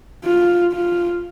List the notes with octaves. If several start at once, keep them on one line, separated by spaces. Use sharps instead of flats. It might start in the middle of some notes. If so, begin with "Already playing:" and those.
F4
F4